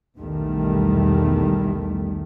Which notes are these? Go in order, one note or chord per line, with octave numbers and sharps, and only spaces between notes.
B1 E2 D#3 G3 A3